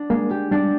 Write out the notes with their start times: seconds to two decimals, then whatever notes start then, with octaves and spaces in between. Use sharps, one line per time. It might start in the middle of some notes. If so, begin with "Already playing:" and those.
Already playing: D4
0.10 G#3 A#3
0.31 G4
0.51 G3 D4